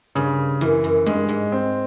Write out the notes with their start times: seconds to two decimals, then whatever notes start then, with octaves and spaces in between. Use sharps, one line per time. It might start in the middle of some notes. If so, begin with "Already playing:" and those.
0.15 G2 C#3
0.61 F#2 E3
0.84 F#2
1.06 G2 G#3
1.29 G#2
1.52 C4